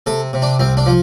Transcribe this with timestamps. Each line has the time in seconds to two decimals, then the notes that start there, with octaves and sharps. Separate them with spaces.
0.06 C3 A4
0.33 C3
0.42 D4
0.60 C2 C4
0.77 D4
0.86 F3